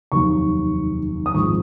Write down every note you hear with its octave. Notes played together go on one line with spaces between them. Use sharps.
F1 D#2 D#3 F#3 C#6
D#6
G#1 G#2 F3 G#3 C#6